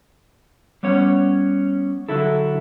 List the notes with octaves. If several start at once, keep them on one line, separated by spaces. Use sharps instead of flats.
G3 B3 C#4 C#5
D3 F#3 E4 A4